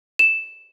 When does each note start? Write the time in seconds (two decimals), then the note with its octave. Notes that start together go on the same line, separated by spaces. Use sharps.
0.19 E7